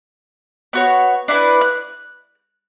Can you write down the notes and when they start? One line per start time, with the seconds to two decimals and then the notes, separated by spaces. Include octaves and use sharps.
0.73 B3 F#4 C#5
1.28 D4 E4 B4
1.61 F#6